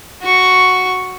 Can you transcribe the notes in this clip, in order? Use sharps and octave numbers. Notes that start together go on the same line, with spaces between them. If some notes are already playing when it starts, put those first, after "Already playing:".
F#4 C#6